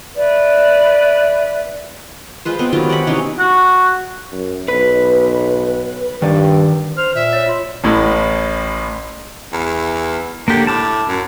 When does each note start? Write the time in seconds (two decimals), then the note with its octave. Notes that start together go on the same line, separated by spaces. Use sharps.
0.15 B4 D5 E5
2.45 G#3 F4 B4 C5
2.59 B3 C4
2.73 D#3 F#3 F4 G4
2.89 D5 F#5 G#5 B5
3.07 C3 E3 C#4 D#4
3.40 F#4
4.33 F#2
4.68 B1 B4
6.22 G2 D#3 D5
6.97 C5 F6
7.15 A#2 E5
7.32 C#5 D#5
7.46 F4 C6
7.84 A1 A2
9.53 E2
10.48 D3 A#3 G4
10.67 A2 A5 D6
11.08 F#2